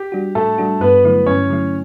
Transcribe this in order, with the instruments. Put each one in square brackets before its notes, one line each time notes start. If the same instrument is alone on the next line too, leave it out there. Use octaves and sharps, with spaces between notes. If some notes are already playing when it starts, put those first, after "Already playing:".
Already playing: [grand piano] G4
[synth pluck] G3 D4 F#4
[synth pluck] A2 [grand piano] A3 A4
[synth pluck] G3 D4 F#4
[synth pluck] G2 [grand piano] B3 B4
[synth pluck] D3 F#3 A3 E4
[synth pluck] G2 [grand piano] C#4 C#5
[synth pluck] D3 F#3 A3 E4